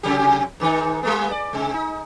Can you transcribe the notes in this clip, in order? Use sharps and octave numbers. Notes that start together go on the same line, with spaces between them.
C3 F#3 G4
G#2 D#3 D#4
G3 A3 B3
D5
C3 G#3
D#4